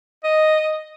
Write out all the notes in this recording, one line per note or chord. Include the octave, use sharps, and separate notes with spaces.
D#5